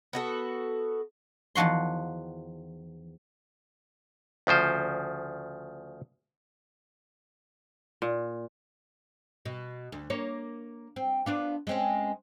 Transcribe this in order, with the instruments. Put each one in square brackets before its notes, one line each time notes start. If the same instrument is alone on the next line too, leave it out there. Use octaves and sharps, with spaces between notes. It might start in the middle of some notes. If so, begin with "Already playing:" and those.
[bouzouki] B3 F#4 A4
[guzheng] E2 D#3 F3 F#4 C6
[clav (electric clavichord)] D2 C#3 F3 C5
[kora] A#2
[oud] B2
D2
A#3 C#5
C4
B3 D4 F4
G#3 C4 C#4